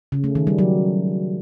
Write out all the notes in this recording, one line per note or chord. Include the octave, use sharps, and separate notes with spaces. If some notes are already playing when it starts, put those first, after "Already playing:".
C#3
A3
D#3
G3
F#3